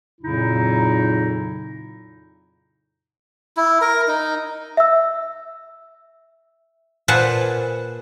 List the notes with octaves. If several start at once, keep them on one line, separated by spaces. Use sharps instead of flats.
F2 A#2 C#3 F#3 D#4 E4
E4
A#4
D#4
E5 E6
A#2 B4 C5 F#5 G#5 A5